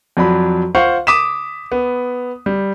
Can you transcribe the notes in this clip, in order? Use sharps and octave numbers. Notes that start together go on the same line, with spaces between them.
F2 F#3 D5 B5
F4 C5 F5 F#5 C#6
D6 D#6 B6 E7
B3
G3